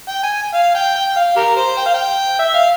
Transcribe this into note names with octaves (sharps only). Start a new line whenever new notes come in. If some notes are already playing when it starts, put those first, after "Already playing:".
G5
G#5
F5
G5
G5
F5
G4 A#4
C5
G5
F5
G5
E5
F5